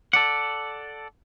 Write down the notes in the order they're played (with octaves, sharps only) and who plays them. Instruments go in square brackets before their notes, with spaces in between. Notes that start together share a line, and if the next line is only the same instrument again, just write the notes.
[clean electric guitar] A4 D5 F#5